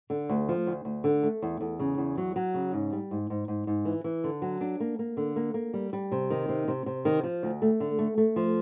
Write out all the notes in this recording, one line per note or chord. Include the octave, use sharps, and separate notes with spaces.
D3
D2
F3
D2
D2
D3
A3
E2
E2
C#3
E2
F#3
F#3
C#3
G#2
G3
G#2
G#2
G#2
G#2
E3
E3
D3
F#3
D4
A#3
A#3
D3
A#3
A#3
G3
G3
C3
D#3
C3
C3
C3
D#3
F3
D2
A3
D3
A3
A3
F3